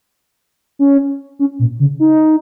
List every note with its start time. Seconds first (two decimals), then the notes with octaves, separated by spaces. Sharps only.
0.79 C#4
1.39 C#4
1.59 A#2
1.80 C#3
2.00 D#4